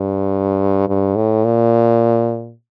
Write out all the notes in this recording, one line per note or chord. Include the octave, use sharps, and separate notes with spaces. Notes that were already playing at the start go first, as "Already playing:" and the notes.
Already playing: G2
G2
A2
A#2